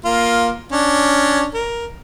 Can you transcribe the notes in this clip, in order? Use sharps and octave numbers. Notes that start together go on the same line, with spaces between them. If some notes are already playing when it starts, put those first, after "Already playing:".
A#3 F4
C#4 D4
A#4